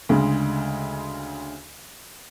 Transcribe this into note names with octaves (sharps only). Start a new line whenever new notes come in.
D2 C#3 G#3